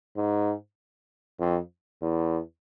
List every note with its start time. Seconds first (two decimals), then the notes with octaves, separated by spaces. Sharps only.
0.16 G#2
1.40 F2
2.02 E2